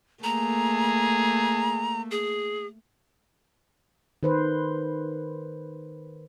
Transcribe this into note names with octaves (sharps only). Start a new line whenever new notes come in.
A3 A#3 G#4 A#5
G#4
D#3 B4 C5